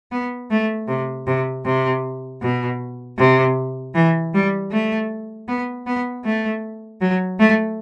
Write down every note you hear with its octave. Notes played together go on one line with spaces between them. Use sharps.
B3
A3
C3
C3
C3
B2
C3
E3
G3
A3
B3
B3
A3
F#3
A3